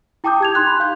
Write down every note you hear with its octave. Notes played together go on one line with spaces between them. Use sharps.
E4 G5 A5 D6 D#6 G6
G4 G#6 F7
D#4 C6 F#6
B5
F5 G6